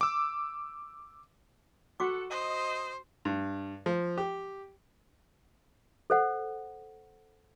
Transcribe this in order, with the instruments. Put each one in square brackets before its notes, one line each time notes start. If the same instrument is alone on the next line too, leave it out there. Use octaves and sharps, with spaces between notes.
[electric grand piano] D6 E6
[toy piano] F#4 C#6 D6 [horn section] A4 F#5
[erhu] C5 [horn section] D#5
[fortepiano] G2
F3
G4
[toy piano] A4 C5 F#5